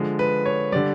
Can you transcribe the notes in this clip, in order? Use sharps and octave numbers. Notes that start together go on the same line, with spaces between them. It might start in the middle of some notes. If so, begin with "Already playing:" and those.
Already playing: D3 F3 G#3
B4
C#5
D3 G3 D5